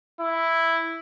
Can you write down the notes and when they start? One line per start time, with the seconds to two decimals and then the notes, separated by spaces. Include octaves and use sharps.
0.20 E4